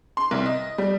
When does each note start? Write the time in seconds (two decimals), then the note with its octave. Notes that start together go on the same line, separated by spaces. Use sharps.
0.17 C6
0.31 C2
0.46 D#5
0.78 G3